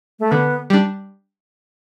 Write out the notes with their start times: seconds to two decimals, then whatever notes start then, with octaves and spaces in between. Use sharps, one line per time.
0.20 A3
0.31 D3 B3
0.70 G3 D4